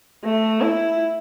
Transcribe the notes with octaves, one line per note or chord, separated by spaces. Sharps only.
A3
E4